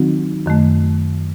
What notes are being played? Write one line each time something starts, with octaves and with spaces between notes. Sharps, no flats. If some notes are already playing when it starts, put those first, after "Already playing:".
Already playing: D#3 F#3 C4 D#4 F#4
F#2 D#3 A3